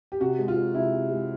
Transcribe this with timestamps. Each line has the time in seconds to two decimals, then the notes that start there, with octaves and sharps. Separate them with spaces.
0.12 G4
0.20 C3 F#4
0.39 G#3
0.48 F4
0.57 G#3
0.75 C3 E4
0.93 C3
1.11 G#3